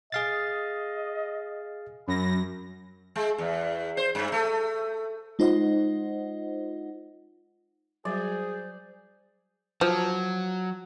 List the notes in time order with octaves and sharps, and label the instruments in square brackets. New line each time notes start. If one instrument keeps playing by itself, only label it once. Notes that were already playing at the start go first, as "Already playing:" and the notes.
[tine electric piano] G#4 F5 A6 [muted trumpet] D#5
[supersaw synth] F#2 A#6 [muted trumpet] B5
[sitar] G#3
E2
C5
G2
A3
[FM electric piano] G#3 D#4 F4 C5 D#5 F#5
[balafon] F#3 G3 F#4 [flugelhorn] G#4 [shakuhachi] C5 [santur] D5
[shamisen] F3 [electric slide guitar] F#3